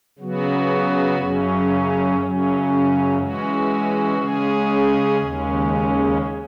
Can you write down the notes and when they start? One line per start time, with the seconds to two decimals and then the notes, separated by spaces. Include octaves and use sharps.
0.19 C#3 F#3 B3 F#4
1.18 F#2 C#3 F#3 C#4
2.18 F#2 C#3 F#3 C#4
3.18 E3 G#3 C#4 F#4
4.18 C#3 G#3 C#4 G#4
5.18 D#2 C#3 G#3 C#4